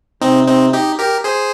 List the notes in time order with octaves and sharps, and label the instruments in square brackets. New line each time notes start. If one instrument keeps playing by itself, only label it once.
[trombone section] C3 [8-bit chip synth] C4 D#4
[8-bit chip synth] C4 D#4
D#4 G4
G4 A#4
G#4 C5